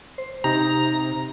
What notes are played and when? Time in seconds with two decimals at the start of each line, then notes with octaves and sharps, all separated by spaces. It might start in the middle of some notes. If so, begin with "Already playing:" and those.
0.18 C5
0.44 C3 D#4 G4 A#5